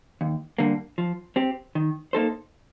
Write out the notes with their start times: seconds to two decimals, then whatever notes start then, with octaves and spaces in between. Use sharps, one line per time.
0.21 D#2
0.58 D3 G3 A#3
0.98 F3
1.36 C4 G4
1.75 D#3
2.13 A#3 D#4 A4 C5